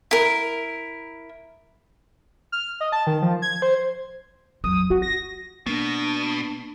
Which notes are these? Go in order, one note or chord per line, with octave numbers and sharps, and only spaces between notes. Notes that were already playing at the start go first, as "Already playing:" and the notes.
E4 A#4
F6
D#5
A5
D#3
F3
G#6
C5
F2 F#3 D#6
C4 F#4
A#6
B2 A#3 B3 D4